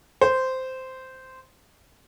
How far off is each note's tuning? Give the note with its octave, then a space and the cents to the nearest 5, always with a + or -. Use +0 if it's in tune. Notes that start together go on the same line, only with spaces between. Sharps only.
C5 -10